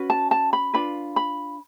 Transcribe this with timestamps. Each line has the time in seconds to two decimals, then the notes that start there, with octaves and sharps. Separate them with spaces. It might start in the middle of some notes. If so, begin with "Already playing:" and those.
Already playing: C#4 F#4 B4
0.10 A5
0.31 A5
0.53 B5
0.74 D4 F4 B4 B5
1.16 B5